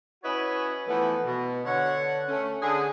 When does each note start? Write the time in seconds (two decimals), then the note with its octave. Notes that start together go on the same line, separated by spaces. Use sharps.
0.24 C#4 E4 F#4 B4 C#5 D#5
0.88 E3 F3 A3 B3
1.25 B2
1.65 D3 C#5 F#5
2.28 A3 C#4
2.62 D3 G#4